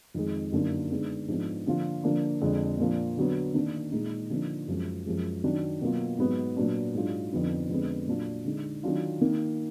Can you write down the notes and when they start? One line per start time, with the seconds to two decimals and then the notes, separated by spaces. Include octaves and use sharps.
0.14 F2 D#3 G#3 D#4
0.52 F#2 D3 F#3 A#3 D#4
0.91 D3 G#3 B3 D#4
1.28 G#2 F3 B3 D4
1.67 D3 F3 A#3 F4
2.04 D3 F3 A#3 D4 F4
2.41 F2 D3 G#3
2.79 A#2 F3 A#3 D4 F4
3.17 D3 F#3 B3
3.54 D#3 A#3 D4
3.92 A#2 G#3 D#4
4.30 D3 F3 A#3 D#4
4.68 F#2 F3 G#3
5.06 F#2 F3 G#3
5.44 D#3 F#3 D4
5.81 B2 F#3 A#3 F4
6.19 G#2 F#3 B3
6.57 A#2 F#3 B3 D4
6.95 G#2 F#3 D4 F4
7.33 F2 D3 F3 B3 D#4
7.69 F2 D3 G#3 B3
8.07 A#2 F#3 D4 F4
8.45 D3 G#3 D#4
8.83 D#3 F#3 D4 F4
9.21 D#3 A#3 D#4